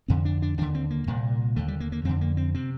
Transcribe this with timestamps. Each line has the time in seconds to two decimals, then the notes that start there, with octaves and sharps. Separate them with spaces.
0.08 F2 D3 C4
0.25 D4
0.42 D4
0.58 D#2 D3 D4
0.75 C4
0.91 A#3
1.07 C2 A#2
1.56 D#2 D3 A3
1.68 G3
1.80 A#3
1.92 A#3
2.05 F2 D3 C4
2.21 A#3
2.37 C4
2.55 C3 C4